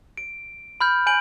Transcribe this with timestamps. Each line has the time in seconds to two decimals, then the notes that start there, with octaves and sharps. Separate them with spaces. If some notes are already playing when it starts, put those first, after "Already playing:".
0.17 D7
0.81 B5 F6 G6
1.07 G#5 G6 D7 F#7